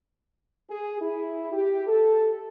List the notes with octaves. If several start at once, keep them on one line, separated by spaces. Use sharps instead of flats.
G#4
E4
G4
A4